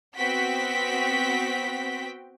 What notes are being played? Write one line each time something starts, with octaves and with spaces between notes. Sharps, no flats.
B3 C4 F#4 G5 B6